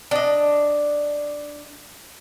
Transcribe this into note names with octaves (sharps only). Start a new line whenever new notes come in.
D4 D#5